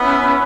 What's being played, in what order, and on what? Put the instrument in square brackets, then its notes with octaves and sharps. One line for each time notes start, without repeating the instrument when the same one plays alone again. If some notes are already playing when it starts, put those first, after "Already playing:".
Already playing: [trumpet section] B3 [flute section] C#4 E4 B4